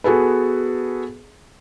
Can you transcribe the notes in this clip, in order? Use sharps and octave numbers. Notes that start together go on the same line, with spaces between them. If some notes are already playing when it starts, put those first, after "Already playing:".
B3 F#4 G#4 A4 B4